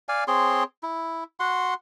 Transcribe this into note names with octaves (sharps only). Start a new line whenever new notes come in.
D5 F5 G#5
C4 G#4 C#5 C6
E4
F#4 F#5 C6